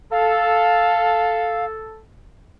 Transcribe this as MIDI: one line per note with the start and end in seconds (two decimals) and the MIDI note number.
0.12 2.02 69
0.12 1.65 77